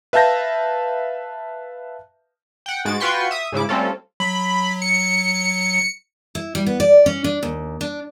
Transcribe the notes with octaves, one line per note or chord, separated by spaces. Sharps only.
B4 E5 F5 A5 G6 A#6
F#5 G5
G#2 G#3 F#4 A6 D7
F4 F#4 B4 G5 C6 C#6
E5 D#6
G#2 C#3 E4 D6
G3 A3 C4 C#4 F4 A4
F#3 B5
C#7
E4
G3
B3
D5
C#4
D4
D#2
D4